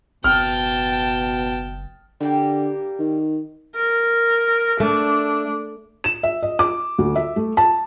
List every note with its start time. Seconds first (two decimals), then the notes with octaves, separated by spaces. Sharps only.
0.24 F#1 B2 G5 A5 F6
2.21 D3 G3 A#3 G4
2.99 D#3
3.77 A#4
4.80 A3 D4
6.04 E7
6.23 E5
6.43 D#5
6.59 D6
6.98 D2
7.16 E5
7.36 A3
7.57 A5